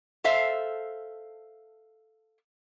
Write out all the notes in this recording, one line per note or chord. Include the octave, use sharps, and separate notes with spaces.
A4 C5 E5 F5